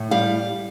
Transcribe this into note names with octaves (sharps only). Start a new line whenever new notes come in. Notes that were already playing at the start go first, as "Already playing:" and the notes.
Already playing: A2
G3 F5